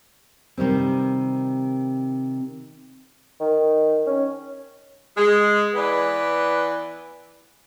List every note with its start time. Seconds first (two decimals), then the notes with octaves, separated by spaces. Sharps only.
0.57 C3 D#3 G3 C4
3.40 D#3
4.07 C#4
5.16 G#3
5.74 E3 B3 D5